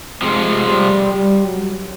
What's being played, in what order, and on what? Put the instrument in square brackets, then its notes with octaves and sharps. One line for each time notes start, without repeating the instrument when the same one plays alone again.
[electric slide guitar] F2 C3 F3 [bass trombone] G#3
[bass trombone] G3
G3
F#3